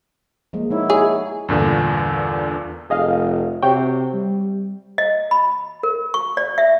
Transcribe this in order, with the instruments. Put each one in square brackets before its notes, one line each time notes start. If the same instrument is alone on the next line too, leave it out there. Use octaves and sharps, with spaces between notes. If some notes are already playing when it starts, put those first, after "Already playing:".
[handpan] F3 G#3 A#3
[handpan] B3 D#4 C#5 [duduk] E4
[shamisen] G#4 [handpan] C#5
[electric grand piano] E2 G2 A#2 D3
[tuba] F1 [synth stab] G#4 D#5 F5
[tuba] C3 [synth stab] F#4 C#5 G5
[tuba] G3
[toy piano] D#5
B5
A#4
C#6
D5
E5